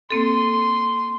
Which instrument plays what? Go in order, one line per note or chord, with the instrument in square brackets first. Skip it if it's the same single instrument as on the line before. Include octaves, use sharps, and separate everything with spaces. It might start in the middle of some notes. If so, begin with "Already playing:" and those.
[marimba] A#3 C4 A4 [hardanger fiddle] C6